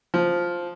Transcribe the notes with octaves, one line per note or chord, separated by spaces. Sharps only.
F3